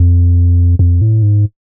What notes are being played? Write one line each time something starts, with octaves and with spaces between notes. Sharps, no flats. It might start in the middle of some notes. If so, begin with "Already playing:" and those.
Already playing: F2
F2
A2
G#2